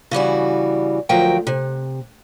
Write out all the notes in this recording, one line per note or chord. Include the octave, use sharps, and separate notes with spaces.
C#3 E3 G3 F#4
D2 F3 F#3 A#4 G5
C3